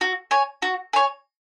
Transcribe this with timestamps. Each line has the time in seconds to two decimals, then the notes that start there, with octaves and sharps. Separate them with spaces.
0.01 F#4
0.31 C#5 G#5
0.62 F#4
0.93 C#5 G#5